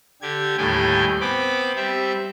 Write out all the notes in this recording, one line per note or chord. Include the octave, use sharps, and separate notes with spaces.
D3 G4 G#6
D#2 A2 G3 G5 G#5
B3 C4 B5 D6
G3 C4 E5